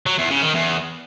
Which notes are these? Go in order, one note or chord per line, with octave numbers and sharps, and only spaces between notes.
F#3
E2
C#3
D#3
E2